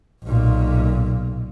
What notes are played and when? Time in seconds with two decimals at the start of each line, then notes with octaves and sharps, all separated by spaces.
0.24 B1 A#2